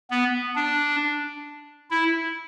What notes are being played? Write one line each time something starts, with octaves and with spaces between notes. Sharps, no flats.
B3
D4
E4